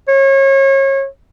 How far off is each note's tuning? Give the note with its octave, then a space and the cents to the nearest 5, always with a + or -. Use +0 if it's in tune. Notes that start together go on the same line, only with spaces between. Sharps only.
C#5 -30